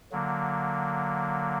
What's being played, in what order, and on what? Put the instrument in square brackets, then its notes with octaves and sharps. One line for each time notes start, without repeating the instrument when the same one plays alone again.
[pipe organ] D3 F#3 A#3